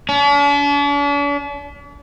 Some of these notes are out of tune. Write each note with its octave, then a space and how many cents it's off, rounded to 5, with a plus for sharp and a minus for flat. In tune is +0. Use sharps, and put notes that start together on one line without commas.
D4 -45